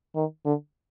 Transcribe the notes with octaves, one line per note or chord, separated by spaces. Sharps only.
D#3
D3